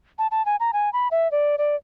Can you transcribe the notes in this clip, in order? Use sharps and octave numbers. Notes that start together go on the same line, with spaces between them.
A5
A5
G#5
A#5
G#5
B5
E5
D5
D5